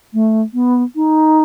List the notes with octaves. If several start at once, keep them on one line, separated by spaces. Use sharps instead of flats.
A3
B3
D#4